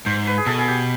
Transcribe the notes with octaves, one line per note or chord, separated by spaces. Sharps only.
G#2 C5
B4
G#4
B2 A4
G#4
G4